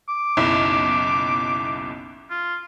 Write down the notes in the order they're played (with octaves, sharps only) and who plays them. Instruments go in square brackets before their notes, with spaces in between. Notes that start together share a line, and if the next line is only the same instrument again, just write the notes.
[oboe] D6
[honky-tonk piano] F#1 B1 E4
[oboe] F4